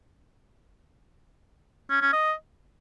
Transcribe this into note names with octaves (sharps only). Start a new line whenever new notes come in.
C#4
C#4
D#5